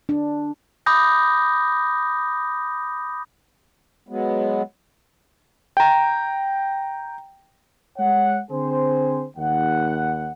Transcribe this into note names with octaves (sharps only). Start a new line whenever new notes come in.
D4
B5 D6 D#6 G6 A#6
F#3 G#3 B3
G5 A#5
G#3 C#5 F#5
D3 C4 G#4 C5
D#2 F#5